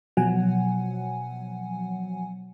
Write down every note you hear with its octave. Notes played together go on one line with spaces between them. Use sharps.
B2 F3 F#3 F#5 G#5